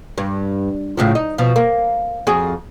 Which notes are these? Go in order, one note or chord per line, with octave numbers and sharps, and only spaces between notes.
G2
A2 C#3 F3
D#4
B2 F3
A#3
F2 F#4 G#4